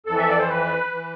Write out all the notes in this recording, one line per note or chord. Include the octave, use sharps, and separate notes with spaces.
F2 E3 A4
E5
D5
C5
B4
E3